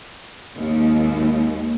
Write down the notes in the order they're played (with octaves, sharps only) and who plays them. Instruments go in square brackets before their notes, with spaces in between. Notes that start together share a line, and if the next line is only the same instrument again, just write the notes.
[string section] G#1 D#2